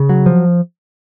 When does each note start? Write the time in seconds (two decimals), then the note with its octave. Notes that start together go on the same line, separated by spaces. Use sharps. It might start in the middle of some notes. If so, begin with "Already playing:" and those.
Already playing: C#3
0.09 F#3
0.26 F3